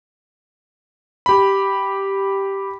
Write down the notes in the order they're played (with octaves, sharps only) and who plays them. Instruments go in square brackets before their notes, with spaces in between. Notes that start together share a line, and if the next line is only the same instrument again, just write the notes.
[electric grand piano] G4 B5